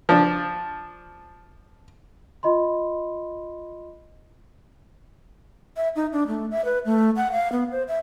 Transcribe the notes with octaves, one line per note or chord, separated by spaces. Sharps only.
F3 D4
F4 D#5 B5 C6
E5
D#4
D4
A3
E5
B4
A3
F#5
F5
B3
C5
E5